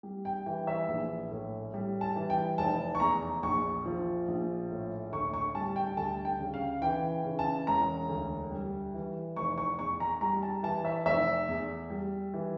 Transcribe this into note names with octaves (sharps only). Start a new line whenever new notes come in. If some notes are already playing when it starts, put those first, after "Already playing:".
G3
G5
E3 G5
E5
A#1
A2
G3
A5
E3
G5
F1 A5
C#6
E2 A#5
A#1 C#6
F3
A#1
A2
D2 C#6
C#6
G3 A5
G5
D2 A5
G5
C#3
F5
E3 G5
C#3
A5
E1 A#5
D2
G3
E3
F1 C#6
C#6
E2 C#6
A#5
G3 A#5
A5
E3 A5
E5
F1 E5
E2
G3
E3